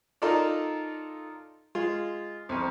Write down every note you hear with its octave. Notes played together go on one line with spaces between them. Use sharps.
D#4 F4 A4 A#4 D5
G#3 F4
C2 F2